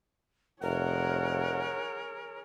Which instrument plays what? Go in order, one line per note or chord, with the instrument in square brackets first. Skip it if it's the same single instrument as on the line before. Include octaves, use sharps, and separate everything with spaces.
[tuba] F1 [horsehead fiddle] G#4 C#5 [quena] A#4 [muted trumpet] F#5